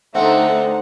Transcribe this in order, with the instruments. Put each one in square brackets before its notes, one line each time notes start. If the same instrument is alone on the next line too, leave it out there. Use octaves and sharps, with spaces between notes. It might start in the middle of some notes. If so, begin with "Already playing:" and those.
[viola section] D3 A3 D#4 [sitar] C4 [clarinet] E5 [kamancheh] F#5